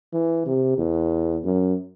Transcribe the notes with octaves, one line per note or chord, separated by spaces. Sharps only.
E3
C3
E2
F#2